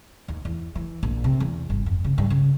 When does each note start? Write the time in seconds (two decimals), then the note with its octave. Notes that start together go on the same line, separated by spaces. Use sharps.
0.28 D#2
0.45 E2
0.75 E3
1.03 A#1
1.24 C3
1.40 E2
1.70 G1
1.86 F2
2.04 C#3
2.18 G2
2.30 C#3